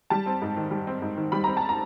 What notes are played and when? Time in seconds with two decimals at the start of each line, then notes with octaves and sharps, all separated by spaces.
0.10 G3 A5
0.26 C4
0.42 G#2
0.57 D#3
0.71 G3
0.87 C4
1.02 G#2
1.17 D#3
1.32 G3 B5
1.44 C4 A#5
1.57 A5
1.69 A#5